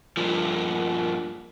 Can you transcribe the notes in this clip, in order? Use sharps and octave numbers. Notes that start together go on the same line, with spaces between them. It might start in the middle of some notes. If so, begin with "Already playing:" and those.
G2 A#2 F3